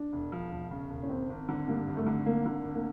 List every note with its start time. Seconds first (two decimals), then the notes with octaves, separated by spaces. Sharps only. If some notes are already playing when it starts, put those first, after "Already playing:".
Already playing: D4
0.13 E1
0.32 F3
0.51 E1
0.71 C#3
0.90 E1
1.03 C#4
1.09 G#1 C4
1.30 G#1
1.49 D3
1.68 G2 A#3
1.87 G#1
1.97 A3
2.06 D3
2.26 G#1 A#3
2.46 D3
2.65 G#1
2.75 A#3